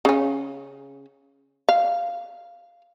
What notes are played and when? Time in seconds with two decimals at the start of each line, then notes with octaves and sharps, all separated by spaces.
0.05 C#3 C#4
1.69 F5